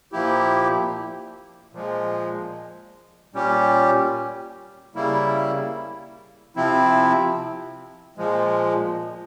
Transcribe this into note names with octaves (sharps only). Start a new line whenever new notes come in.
A#2 F3 A#3 E4 G4
A#2 F3 G#3
A#2 G3 C#4 G4
C#3 G3 A#3 E4
C3 F3 C4 E4
A#2 F3 G#3